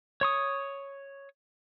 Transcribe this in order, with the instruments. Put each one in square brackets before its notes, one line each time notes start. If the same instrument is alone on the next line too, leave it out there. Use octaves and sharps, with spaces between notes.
[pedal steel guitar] C#5 C#6 D#6